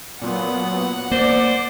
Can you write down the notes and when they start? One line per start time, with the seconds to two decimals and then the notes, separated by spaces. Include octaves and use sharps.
0.22 A#2 F#3 B3 F#5
1.11 A#3 C5 D5